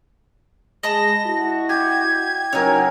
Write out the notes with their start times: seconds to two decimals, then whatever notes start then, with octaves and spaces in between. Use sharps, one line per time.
0.83 G#3 D#5 A5 B5 A#6
1.27 E4 F#4
1.69 G4 G#6
2.53 C#3 F#3 D#4 A#4 C#5 G#5